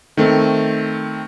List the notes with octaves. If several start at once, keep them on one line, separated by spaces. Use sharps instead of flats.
D#3 A3 C4